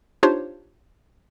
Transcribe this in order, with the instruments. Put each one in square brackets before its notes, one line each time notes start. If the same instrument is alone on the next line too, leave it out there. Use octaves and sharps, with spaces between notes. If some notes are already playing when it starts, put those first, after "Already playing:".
[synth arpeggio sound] D4 D#4 F4 G4 C5 C#5